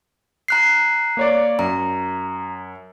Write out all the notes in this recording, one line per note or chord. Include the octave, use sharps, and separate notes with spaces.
A#5 F#6 C7
A#3 C#5 D5
F#2 A#5